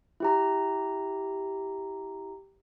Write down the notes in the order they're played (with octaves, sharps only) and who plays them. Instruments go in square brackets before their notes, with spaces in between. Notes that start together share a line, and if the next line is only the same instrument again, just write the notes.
[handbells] E4 G4 A#5